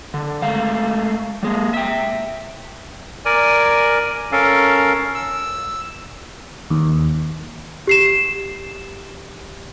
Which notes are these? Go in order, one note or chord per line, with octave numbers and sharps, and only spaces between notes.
D3
G#3 A3 F5
G3 G#3 A#3
E5 G5
A#4 D5 G#5
C#4 A4 A#4 F5
E6
D#2
G4 C7 E7